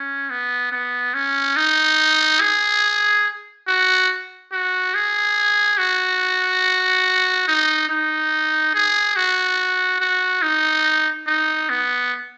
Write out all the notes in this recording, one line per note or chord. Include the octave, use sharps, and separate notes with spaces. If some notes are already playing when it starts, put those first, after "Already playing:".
Already playing: C#4
B3
B3
C#4
D#4
G#4
F#4
F#4
G#4
F#4
D#4
D#4
G#4
F#4
F#4
D#4
D#4
B3